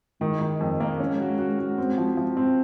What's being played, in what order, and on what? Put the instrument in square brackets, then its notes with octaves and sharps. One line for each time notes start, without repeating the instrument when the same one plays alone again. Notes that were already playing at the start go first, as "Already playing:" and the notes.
[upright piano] D#3 [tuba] G#3
[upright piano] D#3
F2
A#3
C#4
F#4
F#4
F#4
C4
F3
F3
C4